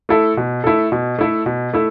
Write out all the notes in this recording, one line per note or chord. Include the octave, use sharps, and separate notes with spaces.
A3 E4 A4
B2
A3 E4 A4
B2
A3 E4 A4
B2
A3 E4